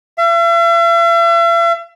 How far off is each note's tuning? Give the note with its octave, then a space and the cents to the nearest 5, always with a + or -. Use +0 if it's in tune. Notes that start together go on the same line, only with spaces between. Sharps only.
E5 +45